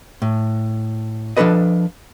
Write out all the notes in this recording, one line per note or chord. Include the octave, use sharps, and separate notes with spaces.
A2
F3 D4 G4 A4 B4 D#5